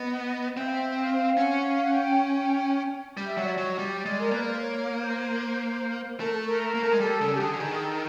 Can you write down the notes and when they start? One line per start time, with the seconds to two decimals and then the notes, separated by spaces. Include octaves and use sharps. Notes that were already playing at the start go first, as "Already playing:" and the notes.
Already playing: B3 D#5
0.57 C4 E5
0.64 F5
0.71 E5
0.96 F5
1.36 C#4 F#5
1.64 F5
1.82 F#5
1.90 G5
2.18 G5
3.17 G3
3.25 E5
3.37 F#3
3.44 D5
3.52 D#5
3.58 F#3
3.78 G3 D5
4.05 G#3
4.18 A#4
4.31 A#3 B4
4.45 C5
4.59 C#5
4.99 C5
6.20 A3 A#4
6.33 A4
6.46 A#4
6.74 A#3
6.83 A3
6.91 G#3
6.99 G3 A4
7.21 C#3
7.34 G4
7.40 D3 G#4
7.60 D#3
7.81 A4
7.90 A#4